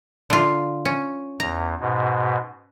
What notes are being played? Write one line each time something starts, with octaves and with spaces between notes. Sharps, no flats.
D3 F4
C#4
E2 A#5
G#2 B2